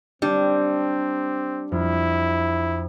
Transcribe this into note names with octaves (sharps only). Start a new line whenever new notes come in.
G3 C4 D4
F2 E4